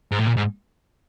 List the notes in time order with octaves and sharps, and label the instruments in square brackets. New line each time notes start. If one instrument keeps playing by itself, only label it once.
[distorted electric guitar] G#2
A2
A#2
G#2